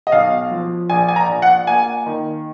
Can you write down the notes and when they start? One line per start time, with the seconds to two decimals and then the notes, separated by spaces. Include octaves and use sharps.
0.07 D#5
0.12 B1 F5
0.51 F3
0.90 A#1 G#5
1.08 G#5
1.16 A#5
1.29 A#1
1.42 F#5
1.67 A#3 G#5
2.06 D#3